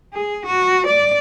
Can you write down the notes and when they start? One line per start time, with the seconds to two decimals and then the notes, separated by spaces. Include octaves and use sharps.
0.13 G#4
0.46 F#4
0.87 D5